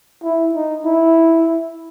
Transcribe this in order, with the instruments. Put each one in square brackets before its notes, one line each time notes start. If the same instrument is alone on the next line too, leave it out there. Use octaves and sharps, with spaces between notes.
[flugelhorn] E4
D#4
E4